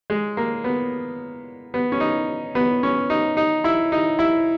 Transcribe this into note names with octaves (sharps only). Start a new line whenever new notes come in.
G#3
A#3
B3
B3
C#4
D#4
B3
C#4
D#4
D#4
E4
D#4
E4